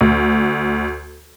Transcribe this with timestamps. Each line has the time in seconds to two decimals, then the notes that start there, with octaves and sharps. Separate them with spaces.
0.01 D2